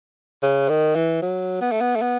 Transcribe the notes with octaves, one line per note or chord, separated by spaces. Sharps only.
C#3
D#3
E3
F#3
B3
A3
B3
A3
B3